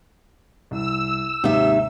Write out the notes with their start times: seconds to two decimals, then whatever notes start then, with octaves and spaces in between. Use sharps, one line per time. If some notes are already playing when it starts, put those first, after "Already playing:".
0.71 C2 E6
1.44 D#2 G#2 C3 D#4 E5